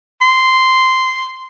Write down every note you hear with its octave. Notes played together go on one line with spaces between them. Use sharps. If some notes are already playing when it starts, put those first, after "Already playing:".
C6